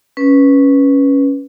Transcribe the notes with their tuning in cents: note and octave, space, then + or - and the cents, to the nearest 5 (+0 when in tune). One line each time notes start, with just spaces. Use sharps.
C#4 +0 B4 -10